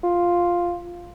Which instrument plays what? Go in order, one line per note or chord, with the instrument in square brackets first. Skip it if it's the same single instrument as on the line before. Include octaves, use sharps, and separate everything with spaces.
[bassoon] F4